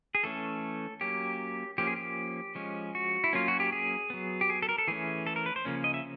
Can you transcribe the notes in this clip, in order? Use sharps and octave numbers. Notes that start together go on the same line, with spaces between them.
G#4
E3 A3 C#4 A4
F#3 A#3 C#4 G4
F3 A#3 C#4 G4
G#4
G4
F3 G#3 C#4
F#4
E4
F#3 A#3 C#4 F4
F#4
G4
G#4
F#3 B3
G4
G#4
A4
A#4
A4
E3 A3 C#4 G#4
A4
A#4
B4
C5
C#3 F3 A#3 C#4
D#5
E5